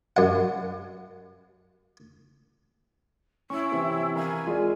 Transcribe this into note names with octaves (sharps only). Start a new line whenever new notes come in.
F#2 F#5
C#4 E4 C#6
C3 E3
A#4 F5 G#5 B5
G#3 F4 G#4 D5